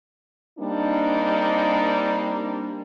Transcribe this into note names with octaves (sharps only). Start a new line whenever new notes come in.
G3 A#3 C4 D4 D#4